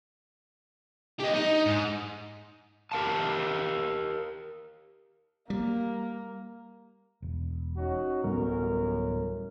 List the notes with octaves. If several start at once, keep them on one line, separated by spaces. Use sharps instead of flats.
G4 D#5
D#4
G#2
G4 A#4 F5 A5
G3 A#3
E1
C#4 D#4 F#4
D1 A1 F#2 G3 B3 A#4